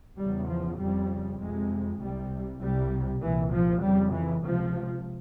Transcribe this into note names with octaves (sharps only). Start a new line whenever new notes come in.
E2 C#3 G3
F3
F2 C#3 G3
F2 C3 G#3
C2 C3 G3
C2 C3 G3
C2 A#2 E3
F3
F2 C#3 G3
E3
C#2 C3 F3